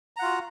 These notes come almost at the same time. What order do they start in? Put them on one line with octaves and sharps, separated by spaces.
A#5 F#5 F4 F#4